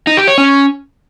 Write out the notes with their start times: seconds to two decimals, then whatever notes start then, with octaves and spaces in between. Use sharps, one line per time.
0.07 D#4
0.17 G4
0.28 C#5
0.38 C#4